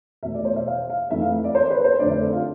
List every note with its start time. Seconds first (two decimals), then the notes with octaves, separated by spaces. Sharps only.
0.23 E2 B2 A3 E5
0.34 D5
0.45 C5
0.56 E5
0.67 F5
0.90 F5
1.11 F2 E3 A3 E5
1.22 F5
1.33 E5
1.44 D5
1.55 C5
1.70 B4
1.84 C5
1.99 F2 D3 A3 D5
2.10 E5
2.21 A4
2.33 F4